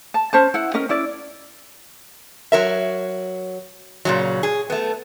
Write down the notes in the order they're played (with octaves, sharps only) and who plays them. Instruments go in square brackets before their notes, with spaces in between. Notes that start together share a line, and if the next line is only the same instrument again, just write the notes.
[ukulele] A5
C#4 C5 A5
E4 F#5
C#4 A#4 D#5
C#4 E4 D5
[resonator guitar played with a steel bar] F#3 A#4 E5
A#2 C#3 F#3
G#4
A3 B3